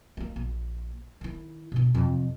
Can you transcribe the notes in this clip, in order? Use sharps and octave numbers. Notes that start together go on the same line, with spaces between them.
A3 A#3
A#1
D#3 E4
B2 D4
F2 C3